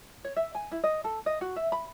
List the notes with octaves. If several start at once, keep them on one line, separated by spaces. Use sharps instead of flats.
C#5
E5
G#5
E4
D#5
A4
D#5
F#4
E5
B5